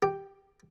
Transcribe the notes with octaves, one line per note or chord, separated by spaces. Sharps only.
G4